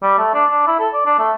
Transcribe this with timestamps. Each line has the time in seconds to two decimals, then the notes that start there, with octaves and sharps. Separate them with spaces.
0.02 G3
0.18 A3
0.34 D4
0.51 D4
0.67 E4
0.79 A4
0.93 D5
1.06 D4
1.19 A3